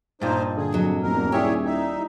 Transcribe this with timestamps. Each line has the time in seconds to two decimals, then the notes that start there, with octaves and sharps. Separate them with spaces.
0.22 G2 A#2 D#4 C5
0.57 D3 G#4
0.73 F2 F#3 D#5
1.03 D#1 E2 A#4
1.32 G3 E4 G4 G#4 C#5 E5
1.65 D#4 E5